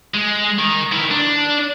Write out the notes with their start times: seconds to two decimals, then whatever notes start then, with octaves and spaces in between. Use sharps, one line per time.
0.14 G#3
0.59 D#3
0.92 D#3 E4
1.11 D4